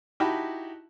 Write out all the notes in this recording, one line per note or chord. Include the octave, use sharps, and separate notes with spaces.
D#4 E4 F#4 G4 A5 B5